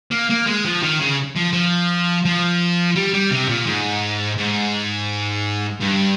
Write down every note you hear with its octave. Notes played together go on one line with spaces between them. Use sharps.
A#3
A#3
G#3
F3
D#3
C#3
F3
F3
F3
G3
G3
C3
A#2
G#2
G#2
G2